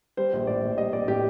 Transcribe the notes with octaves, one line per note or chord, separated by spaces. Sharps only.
G3 C5
A#1
A2 D5
A#1
G3 D#5
A#1 D5
A2 G4